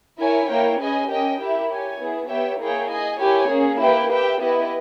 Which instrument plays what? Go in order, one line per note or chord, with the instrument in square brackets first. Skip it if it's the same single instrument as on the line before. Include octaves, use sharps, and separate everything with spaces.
[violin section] E4 A#4 C#5 G#5
A#3 E4 A#4 C#5 G5
C#4 G#4 B4 D#5 G#5
C#4 G4 A#4 D#5 G5
E4 G4 A#4 E5
G4 C#5 G#5
B3 E4 G#4
B3 G4 C#5 E5 G5
A#3 E4 G#4 C#5 G5
G#4 D#5 G#5
E4 G4 A#4 C#5 G#5
A#3 C#4 G#4
A#3 E4 G4 B4 G5
G4 B4 E5 G5
B3 E4 G4 B4 D#5